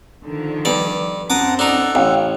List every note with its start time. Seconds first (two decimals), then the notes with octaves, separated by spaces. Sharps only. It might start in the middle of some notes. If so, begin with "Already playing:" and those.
0.24 D3 D#3 F3
0.65 G2 B3 D5
1.30 F#2 C4 F#5 A5 A#5 D6 D#6
1.59 D4 D#4 A4 F#5
1.95 A1 C#4 F5 G5